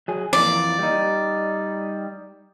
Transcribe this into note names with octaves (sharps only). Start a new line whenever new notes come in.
F#3 G#4
F2 E3 A#3 D5
G3 D#4